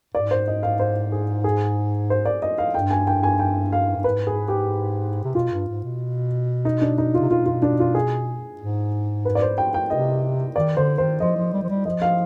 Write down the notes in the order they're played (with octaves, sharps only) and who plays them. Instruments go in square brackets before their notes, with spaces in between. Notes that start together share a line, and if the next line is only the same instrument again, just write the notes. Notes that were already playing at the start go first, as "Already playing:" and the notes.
[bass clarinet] G#2 [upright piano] D5
[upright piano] C5
D#5
F5
C5
G#4
G#4
C5
D5
D#5
F5
[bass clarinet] G2 [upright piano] G5
[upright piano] G#5
G5
G#5
G5
F5
[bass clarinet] G2
[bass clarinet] G#2 [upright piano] B4
[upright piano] G#4
G4
[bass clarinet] C3
[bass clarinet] B2 [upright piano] F4
[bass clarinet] G2
G#2
B2
[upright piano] D#4
D4
D#4
F4
[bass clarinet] C3
[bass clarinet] B2 [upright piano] F4
[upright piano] F4
D4
F4
G#4
[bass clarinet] G#2
[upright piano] B4
D5
C5
G5
G5
[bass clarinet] C3 [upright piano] D#5
[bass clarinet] D#3 [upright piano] D5
[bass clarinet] D3 [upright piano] C5
[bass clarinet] D#3 [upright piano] C5
[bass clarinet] F3 [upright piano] D#5
[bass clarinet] F3
G3
F3
G3
[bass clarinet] F3 [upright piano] D#5
[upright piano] F5